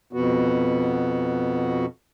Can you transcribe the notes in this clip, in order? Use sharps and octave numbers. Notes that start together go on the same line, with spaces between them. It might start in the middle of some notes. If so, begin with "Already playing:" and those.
F2 B2 B3 F#4